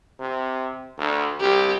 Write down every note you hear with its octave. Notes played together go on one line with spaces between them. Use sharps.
C3
D2
C2 G4